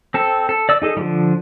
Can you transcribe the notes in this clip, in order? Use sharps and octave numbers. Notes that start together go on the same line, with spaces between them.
C4 A4
A4
D5 E6
D#4 G#4 A4
D3 F3 G3